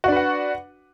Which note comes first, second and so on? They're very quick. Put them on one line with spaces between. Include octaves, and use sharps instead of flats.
F#4 D4 B4 F#5